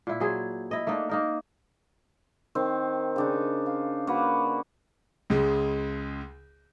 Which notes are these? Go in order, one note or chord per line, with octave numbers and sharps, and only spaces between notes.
A#2 E4
F#3 G#4 C5
E4 D#5
A3 A#3 D4 D#4
A#3 D#4 A#4
D#3 C4
C#3 D4 D#4
F5
A#3 F#4 B4 F#5
C#2 C#3 G#3